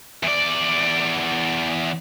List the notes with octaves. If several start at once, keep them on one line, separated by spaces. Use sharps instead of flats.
E2 D5